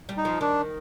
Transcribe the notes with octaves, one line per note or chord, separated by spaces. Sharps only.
G3
D#4
F3
D#3 D4